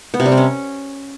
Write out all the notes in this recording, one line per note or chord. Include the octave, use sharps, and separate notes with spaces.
B3
C3
G3
C4
C#4